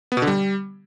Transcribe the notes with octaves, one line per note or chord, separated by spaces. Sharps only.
B3
B2
D3
G3